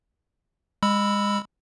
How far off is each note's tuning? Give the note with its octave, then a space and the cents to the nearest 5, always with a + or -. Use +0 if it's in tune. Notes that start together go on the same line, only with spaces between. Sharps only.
G#3 -25 B5 +0 E6 +0